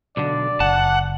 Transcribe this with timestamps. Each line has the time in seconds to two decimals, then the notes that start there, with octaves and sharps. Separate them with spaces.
0.17 B1 D3 D5
0.60 F#1 F#5 A5